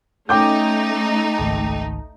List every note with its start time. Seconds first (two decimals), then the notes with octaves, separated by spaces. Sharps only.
0.29 A3 C#4 D#4 G5 D6 G6
1.38 G#1 C#2 A5